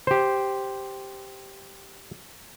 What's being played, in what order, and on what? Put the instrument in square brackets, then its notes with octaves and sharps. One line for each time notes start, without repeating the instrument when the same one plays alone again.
[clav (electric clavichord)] G4 C5